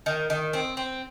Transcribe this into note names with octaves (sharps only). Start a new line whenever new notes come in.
D#3
D#3
C4
C4